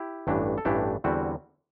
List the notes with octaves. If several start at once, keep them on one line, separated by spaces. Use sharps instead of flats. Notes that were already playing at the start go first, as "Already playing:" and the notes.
Already playing: E4 G4
A1 G2 E3 A3 D4
A4
A1 G2 E3 A3 D4 E4 G4
E2 D3 G3 C4 E4 F#4